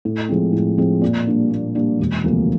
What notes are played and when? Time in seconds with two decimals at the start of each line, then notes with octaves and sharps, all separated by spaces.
0.05 A2
0.29 F3 G#3 C4
0.53 A2
0.78 F3 G#3 C4
1.02 A#2
1.26 G3 A#3 D4
1.51 A#2
1.75 G3 A#3 D4
1.99 E1
2.24 D2 C3 F3 A#3